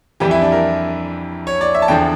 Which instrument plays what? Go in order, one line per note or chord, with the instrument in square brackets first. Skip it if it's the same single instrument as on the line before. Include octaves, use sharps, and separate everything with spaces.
[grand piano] F2 E3 G3 G4
E4
D4
A#4
C#5
D5
E5
A5
E2 D3 F3 G5